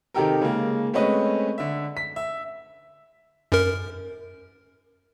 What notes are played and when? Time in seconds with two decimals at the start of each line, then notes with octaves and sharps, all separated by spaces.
0.14 C3 D#3 D#4 G4 A4 A#4
0.42 C#3 G#3 A#3
0.94 G#3 A3 C4 C#4 B4 D#5
1.58 D3 E5
1.97 B6
2.16 E5
3.52 F#2 A#4